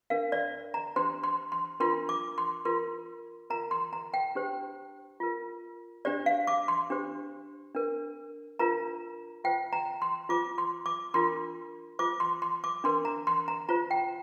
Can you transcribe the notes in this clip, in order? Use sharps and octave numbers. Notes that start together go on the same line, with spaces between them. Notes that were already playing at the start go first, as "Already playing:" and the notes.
D4 A#4 F5
D5
A#5
D4 G4 C5 C6
C6
C6
D4 F4 A#4 C6
D6
C6
F4 A#4 C6
F4 A#4 A#5
C6
A#5
G5
D4 G4 C5
F4 A#4
D4 G4 C5 D5
F5
D6
C6
D4 G4 C5
D4 A#4
D4 F4 A#4 A#5
F4 C5 G5
A#5
C6
F4 C5 D6
C6
D6
D4 F4 A#4 C6
F4 C5 D6
C6
C6
D6
D4 A#4 C6
A#5
C6
A#5
F4 C5 A#5
G5